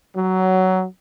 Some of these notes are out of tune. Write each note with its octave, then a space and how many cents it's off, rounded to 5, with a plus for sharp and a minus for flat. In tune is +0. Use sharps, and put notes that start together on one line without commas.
F#3 +15